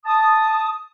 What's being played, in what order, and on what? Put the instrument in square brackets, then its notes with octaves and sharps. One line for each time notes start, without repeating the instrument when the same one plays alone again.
[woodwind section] A5 D#6